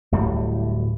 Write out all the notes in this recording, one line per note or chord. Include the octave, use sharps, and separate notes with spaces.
D1 A2 G3